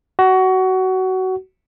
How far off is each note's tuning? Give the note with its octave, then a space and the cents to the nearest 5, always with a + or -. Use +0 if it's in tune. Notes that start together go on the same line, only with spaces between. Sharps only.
F#4 +20